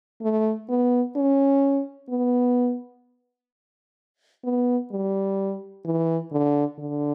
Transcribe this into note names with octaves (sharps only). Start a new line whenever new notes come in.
A3
B3
C#4
B3
B3
G3
E3
D3
D3